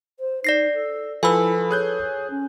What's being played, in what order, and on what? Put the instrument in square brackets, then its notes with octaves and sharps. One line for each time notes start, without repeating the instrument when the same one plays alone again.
[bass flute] C5
[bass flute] D#4 [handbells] D5 A#6 C7
[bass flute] A4
[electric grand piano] F3 B5 [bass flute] E4 [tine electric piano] A4 B4 [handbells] G#5 E6
[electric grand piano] G#4 F#6 G6 [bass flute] C#5
[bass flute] C#4